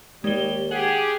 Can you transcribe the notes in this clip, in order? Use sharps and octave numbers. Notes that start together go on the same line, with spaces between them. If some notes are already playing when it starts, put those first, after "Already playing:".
D#2 G3 G#3 G7
G4 G#4 F#5 F#7